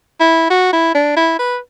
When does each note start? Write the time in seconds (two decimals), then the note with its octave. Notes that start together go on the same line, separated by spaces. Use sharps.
0.20 E4
0.50 F#4
0.73 E4
0.95 D4
1.17 E4
1.39 B4